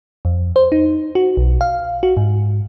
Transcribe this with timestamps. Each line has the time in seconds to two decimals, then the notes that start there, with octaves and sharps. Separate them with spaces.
0.25 F2
0.56 C5
0.72 D#4
1.15 F#4
1.37 B1
1.61 F5
2.03 F#4
2.17 G#2